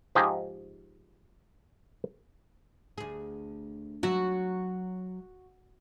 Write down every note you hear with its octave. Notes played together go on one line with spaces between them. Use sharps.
G#2 F3 D#4 G4 G#4
D2 G#4
F#3 F#4 E5